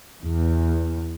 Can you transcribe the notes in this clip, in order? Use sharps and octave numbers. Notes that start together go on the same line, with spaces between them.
E2